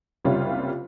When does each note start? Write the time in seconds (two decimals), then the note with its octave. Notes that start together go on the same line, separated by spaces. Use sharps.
0.25 F#1 C2 G3 F4 C#5 E5